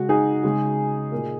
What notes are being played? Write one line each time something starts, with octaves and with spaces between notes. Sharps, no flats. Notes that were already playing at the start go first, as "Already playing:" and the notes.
Already playing: C#3 G#3 F#4
D#4 G#4
C#3 G#3
A#2 A#3